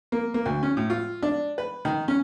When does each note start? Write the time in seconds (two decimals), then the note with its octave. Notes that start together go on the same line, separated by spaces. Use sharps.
0.12 A#3
0.34 A#3
0.46 D2
0.63 C#4
0.77 A2
0.90 F4
1.23 D4
1.58 B4
1.85 D#3
2.08 C#4